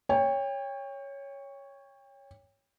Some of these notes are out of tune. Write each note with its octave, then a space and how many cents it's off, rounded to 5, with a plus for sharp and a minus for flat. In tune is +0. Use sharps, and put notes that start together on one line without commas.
C#5 +0 G5 +30